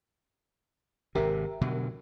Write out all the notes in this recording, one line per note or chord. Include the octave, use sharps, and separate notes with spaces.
G#1 C3 G4 A#4 E5
B2 D3 F#3